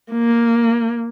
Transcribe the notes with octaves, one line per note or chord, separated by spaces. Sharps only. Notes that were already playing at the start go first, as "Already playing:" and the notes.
A#3